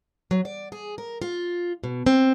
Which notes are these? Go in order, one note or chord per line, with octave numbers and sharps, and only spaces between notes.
F#3
D5
G#4
A#4
F4
B2
C4